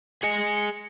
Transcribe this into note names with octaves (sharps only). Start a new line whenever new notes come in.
G#4 D#5 G#5 C#7